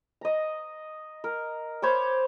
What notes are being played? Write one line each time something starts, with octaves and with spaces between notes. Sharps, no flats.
D#5 A#5
A#4
C5 C#5 B5 D6